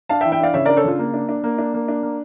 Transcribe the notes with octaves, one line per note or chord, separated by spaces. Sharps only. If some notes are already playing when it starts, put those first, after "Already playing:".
D4 F5 A5
E5 G5
E3
E5 G5
D4 D5 F5
C#3 C#5 E5
D4 A#4 D5
A4 C#5
C#3 F4
A#3
D4
D4
A#3
D4
A#3
D4
A#3